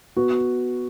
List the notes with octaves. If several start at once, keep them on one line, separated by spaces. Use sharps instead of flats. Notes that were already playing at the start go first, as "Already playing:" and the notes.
B3 F#4